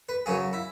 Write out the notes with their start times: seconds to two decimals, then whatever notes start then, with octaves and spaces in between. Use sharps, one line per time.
0.09 B4
0.26 F#2 C#3 F#3 G#4
0.53 E4